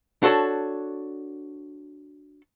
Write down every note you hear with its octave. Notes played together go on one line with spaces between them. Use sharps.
D4 F#4 A4 C#5 A5